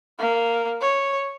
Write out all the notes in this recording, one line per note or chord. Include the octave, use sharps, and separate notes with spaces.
A#3
C#5